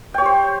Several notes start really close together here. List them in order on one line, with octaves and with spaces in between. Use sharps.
G5 C#5 G4 C5